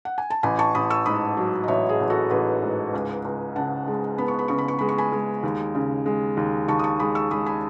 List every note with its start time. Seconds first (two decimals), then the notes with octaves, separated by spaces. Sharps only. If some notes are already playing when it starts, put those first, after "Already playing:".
0.05 F#5
0.18 G#5
0.30 A5
0.43 A1 G#5 B5
0.59 A5 C#6
0.75 A1 B5 D#6
0.90 C#6 E6
1.06 G#2 B5 D#6
1.37 F#3
1.64 D#5
1.68 A1 C#5 E5
1.89 G#4
2.00 A1
2.10 F#4 A4
2.31 A1 G#4 B4
2.62 G#2
2.93 C#2
3.25 C#2
3.56 C#3 F#5 A5
3.87 G#3
4.18 B3 B5
4.28 C#6
4.39 B5
4.48 C#3 C#6
4.58 B5
4.68 C#6
4.79 G#3 B5
4.89 C#6
4.98 G#5 B5
5.12 G#3
5.43 D#2
5.75 C#3
6.06 G#3
6.37 D#2
6.68 D#2 A5 C#6
6.79 D#6
6.84 A5 C#6
7.00 G#3 B5 D#6
7.15 C#6 E6
7.31 G#3 B5 D#6
7.46 G#5 B5